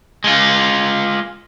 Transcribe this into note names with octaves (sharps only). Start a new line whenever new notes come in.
G#3 F4